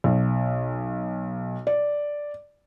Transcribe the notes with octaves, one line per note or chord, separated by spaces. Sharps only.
B1
D5